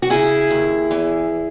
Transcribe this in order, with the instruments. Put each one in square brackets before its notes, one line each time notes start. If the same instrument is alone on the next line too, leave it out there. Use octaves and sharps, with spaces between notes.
[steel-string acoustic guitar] F#4
C#3 E4 G#4
D#2
E2